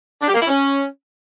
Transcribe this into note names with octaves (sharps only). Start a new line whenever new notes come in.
D4
G4
A#3
E4
C#4